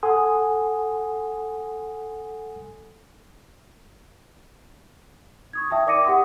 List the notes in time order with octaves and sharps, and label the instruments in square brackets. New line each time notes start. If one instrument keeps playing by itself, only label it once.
[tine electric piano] A4 F#5 G#5 C6 D#6
[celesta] C#6 D#6 G#6
E5 G5 A5 D#6
A#4 D5 D6 A#6 C#7 D#7
G4 F#5 C6 D#6